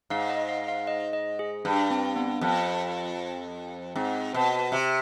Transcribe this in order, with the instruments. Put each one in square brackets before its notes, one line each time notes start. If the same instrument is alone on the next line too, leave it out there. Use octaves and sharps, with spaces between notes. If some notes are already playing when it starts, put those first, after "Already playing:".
[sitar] G#2 [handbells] F5
[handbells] D#5
F5
F5
D#5
D#5
G#4
[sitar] G2 [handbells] D4
[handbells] C4
B3
[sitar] F2
[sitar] G#2 [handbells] C4
[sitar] B2
C3